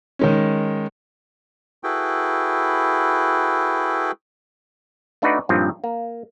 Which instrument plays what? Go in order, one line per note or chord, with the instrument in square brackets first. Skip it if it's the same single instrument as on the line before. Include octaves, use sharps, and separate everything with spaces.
[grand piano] D#3 G#3 C#4
[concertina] E4 F#4 G#4 A4 B4 G5
[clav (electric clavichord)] A3 D4 D#4 F#4 B4 D5
G2 A#2 D#3 F3 F#3 C4
A#3